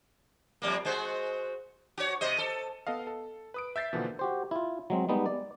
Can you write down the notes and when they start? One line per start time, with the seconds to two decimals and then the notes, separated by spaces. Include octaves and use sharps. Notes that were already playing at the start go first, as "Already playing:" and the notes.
0.62 F2 G3 A#3
0.85 G#3 F#4 C5
1.98 F#4 C#5
2.21 C3 C5 D#5
2.38 A4
2.87 B3 A4 D#5 F5
3.07 A4
3.54 B4 D#6 D7
3.76 E5 G6 A6 B6 C7
3.93 B2 D3 E3 F3 A#3 B3
4.19 F#4 G4 C5
4.51 E4 F4
4.90 F#3 G#3 C4
5.09 G3 G#3 B3 D#4
5.26 D5